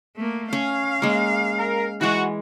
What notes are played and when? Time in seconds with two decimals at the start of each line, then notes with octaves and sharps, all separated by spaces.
0.17 A3 A#3
0.53 C#4 F5
1.02 G#3 A#3
1.59 A#4
2.01 E3 G#3 F#4